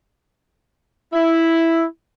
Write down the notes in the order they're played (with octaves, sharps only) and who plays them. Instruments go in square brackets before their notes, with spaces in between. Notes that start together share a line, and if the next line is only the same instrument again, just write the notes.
[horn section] E4